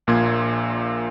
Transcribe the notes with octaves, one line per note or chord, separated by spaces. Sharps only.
A#1 A#2 A#3 C6 G#6